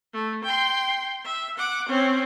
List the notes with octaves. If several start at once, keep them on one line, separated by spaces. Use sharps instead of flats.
A3
G5 C6
E5
F#5 D6
C4 C#4